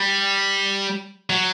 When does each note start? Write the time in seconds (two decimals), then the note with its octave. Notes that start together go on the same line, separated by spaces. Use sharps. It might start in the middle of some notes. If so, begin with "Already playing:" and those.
Already playing: G3
1.30 F#3